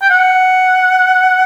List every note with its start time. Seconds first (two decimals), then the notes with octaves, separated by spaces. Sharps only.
0.01 G5
0.10 F#5